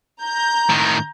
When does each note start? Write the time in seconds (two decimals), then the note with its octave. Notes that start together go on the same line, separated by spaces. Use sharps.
0.22 A#5 G6
0.69 A2 D#3